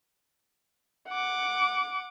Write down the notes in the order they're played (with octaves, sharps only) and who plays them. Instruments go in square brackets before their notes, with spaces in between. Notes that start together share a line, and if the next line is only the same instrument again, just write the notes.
[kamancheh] F#5 D6